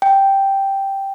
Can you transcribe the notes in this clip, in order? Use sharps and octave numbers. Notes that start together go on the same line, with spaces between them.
G5